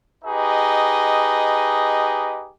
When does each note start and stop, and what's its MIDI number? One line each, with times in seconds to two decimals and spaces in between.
0.24 2.50 63
0.24 2.50 67
0.24 2.50 68
0.24 2.50 71
0.24 2.50 75